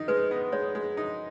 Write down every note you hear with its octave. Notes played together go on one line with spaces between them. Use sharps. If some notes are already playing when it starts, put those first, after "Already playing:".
Already playing: D#3 D#4
G#3 B4
B3
G#3 C#5
G#3
D#4